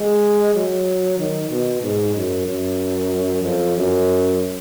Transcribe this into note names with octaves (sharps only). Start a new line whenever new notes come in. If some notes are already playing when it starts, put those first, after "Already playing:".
Already playing: G#3
F#3
D#3
B2
G#2
F#2
F#2
F2
F#2